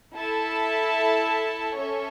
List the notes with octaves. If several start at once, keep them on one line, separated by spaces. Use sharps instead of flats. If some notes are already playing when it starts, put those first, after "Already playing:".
E4 A4 E5 A5
C#4 A4 C#5 E5